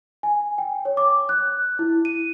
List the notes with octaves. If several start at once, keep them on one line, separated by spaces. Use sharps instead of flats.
G#5
G5
C#5
D6
F#6
E4
D#7